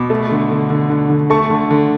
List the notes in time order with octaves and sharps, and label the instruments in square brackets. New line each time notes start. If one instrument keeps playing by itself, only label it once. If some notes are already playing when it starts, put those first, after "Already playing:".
Already playing: [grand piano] B2 B5 D6
A3
D3
D3
D3
D3
D3
A3 A5 C#6
D3
D3